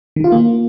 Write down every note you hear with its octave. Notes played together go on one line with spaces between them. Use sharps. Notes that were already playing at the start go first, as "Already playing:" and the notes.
D#3
F4
A#3